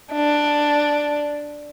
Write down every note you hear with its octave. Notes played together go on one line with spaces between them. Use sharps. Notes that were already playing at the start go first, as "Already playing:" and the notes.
D4